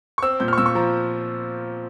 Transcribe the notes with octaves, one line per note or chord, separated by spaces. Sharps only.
C#6
C4 E6
A#2 G6
F6
C#6
A#2 E6
C#6
F3 A#5